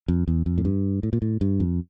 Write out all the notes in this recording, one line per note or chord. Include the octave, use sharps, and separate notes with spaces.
F2
E2
F2
A2
G2
A2
A#2
A2
G2
F2